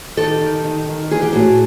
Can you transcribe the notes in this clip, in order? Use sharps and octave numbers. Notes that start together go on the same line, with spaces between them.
D#3 G4 A4
D#3
D#3
D#3
E3 G#4
G4
A2 F#4 G#4